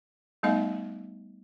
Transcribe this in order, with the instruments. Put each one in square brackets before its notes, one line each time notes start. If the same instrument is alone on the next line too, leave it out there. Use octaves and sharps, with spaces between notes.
[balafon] G3 A3 B3 D#4 D#5 F5